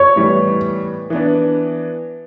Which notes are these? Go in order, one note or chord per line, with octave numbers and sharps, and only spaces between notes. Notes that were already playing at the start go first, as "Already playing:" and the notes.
Already playing: C#5
A2 E3 G3 B3
E3 B3 D4